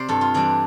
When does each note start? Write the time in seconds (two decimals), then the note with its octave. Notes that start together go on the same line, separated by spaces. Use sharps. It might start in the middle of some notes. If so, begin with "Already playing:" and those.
Already playing: C3 C5 D5
0.09 G2 A4
0.21 F4
0.34 E3 G3 D4